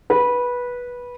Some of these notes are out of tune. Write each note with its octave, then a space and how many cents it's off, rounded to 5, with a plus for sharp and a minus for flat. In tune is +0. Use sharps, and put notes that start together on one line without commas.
B4 -15